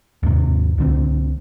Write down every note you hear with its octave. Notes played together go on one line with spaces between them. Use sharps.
D#2 G#2 C3
C#2 D3 C4